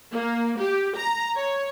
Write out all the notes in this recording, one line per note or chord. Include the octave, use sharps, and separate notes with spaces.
A#3
G4
A#5
C#5